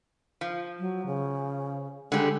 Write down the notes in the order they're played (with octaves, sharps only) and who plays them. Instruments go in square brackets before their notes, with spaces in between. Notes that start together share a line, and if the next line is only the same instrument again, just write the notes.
[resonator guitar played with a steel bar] F3
[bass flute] F#3
C#3
[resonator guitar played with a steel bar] D3 G3 [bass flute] G#3